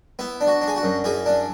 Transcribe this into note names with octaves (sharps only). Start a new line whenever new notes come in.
B3 E4
D4
F#4
D4
G#4
F#4
F#2
F#2 E4 G#4
D4